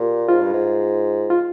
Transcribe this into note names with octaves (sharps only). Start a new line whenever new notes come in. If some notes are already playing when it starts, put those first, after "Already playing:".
Already playing: A#2 G4
G#2 F4
G2
G#2
F4